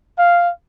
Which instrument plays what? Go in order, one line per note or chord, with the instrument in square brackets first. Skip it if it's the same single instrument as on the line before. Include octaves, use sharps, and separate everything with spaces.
[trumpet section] F5